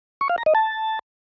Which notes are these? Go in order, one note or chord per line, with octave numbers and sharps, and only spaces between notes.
C#6
F5
A#5
D#5
A5